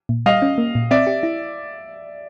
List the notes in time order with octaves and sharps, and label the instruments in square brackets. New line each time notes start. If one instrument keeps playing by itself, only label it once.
[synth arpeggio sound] A#2
[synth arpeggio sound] G3 [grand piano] D#5 F5
[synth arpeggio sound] C#4
A#3
A#2
[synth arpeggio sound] C4 [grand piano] D5 E5
[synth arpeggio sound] G4
E4